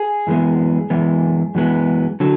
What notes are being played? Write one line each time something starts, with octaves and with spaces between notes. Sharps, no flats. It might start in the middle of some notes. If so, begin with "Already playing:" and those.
Already playing: G#4
F#2 E3 G#3 B3
F#2 E3 G#3 B3
F#2 E3 G#3 B3
D3 F#3